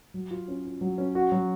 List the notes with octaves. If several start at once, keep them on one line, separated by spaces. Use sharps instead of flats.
F#3
F4
C#4
F4
F#3
C#4
F#4
F#3